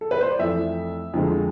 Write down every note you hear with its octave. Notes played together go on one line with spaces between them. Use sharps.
A4
B4
C5
D5
F2 E3 A3 E5
F2 D3 F3 G#3